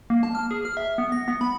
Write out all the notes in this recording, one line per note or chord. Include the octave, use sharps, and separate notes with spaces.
A#3
A5
F6
G#4
F6
E5
B3
A#6
B3
B5